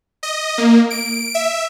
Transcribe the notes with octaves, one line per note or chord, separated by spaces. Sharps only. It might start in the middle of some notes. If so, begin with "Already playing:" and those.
D#5
A#3
D7
E5